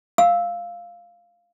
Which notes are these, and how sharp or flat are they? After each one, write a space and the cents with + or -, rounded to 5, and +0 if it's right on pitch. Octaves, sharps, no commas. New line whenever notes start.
F5 +0 E6 -10